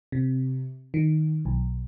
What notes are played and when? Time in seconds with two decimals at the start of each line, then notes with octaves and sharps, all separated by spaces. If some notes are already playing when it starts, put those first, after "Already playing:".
0.12 C3
0.94 D#3
1.45 B1